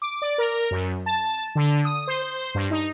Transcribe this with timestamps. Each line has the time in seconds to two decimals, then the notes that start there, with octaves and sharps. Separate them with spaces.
0.02 D6
0.22 D5
0.38 A#4
0.71 F#2
1.06 A5
1.55 D3
1.85 D#6
2.07 C5
2.22 C5
2.55 G2
2.71 D#4